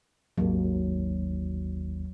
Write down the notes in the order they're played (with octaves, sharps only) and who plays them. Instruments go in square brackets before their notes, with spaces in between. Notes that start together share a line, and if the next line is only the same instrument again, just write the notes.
[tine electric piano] G#1 D#2 [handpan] F#3